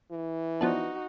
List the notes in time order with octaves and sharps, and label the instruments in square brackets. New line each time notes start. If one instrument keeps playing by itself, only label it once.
[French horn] E3
[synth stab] F3 B3 D4 [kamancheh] D#4 F#4